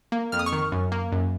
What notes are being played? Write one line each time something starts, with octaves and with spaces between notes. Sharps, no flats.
A#3
F2 F6
D#6
C#6 F6
D#3
F#2
A#3
F#2